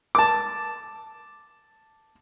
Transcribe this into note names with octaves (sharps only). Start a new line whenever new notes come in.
A5 D6